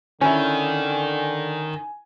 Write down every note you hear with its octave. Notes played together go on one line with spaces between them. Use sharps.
D3 D#3 C#4 E4 G#5